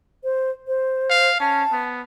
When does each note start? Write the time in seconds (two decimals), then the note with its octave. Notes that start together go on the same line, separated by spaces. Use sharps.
0.24 C5
0.68 C5
1.10 F5
1.40 C#4 A5
1.73 B3